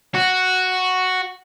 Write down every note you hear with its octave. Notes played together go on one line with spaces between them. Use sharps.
F#4